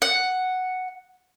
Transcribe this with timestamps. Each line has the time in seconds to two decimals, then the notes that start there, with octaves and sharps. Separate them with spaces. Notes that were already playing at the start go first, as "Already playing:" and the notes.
0.02 F#5